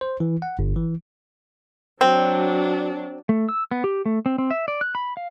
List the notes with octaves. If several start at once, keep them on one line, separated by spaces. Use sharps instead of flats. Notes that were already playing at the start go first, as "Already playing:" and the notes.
C5
E3
F#5
G1
E3
F#3 C4 D4
A3
E6
B3
G4
A3
C4
C4
E5
D5
F#6
B5
F5